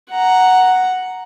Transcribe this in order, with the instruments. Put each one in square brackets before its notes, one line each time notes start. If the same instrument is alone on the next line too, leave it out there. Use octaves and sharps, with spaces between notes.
[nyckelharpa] F#5 A#5